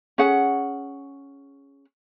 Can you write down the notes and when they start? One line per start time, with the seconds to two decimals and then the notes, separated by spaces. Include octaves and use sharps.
0.18 C#4 G#4 F#5